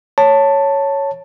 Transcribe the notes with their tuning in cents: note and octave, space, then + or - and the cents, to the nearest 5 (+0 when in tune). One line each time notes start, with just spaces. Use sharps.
C#5 +0 A5 +10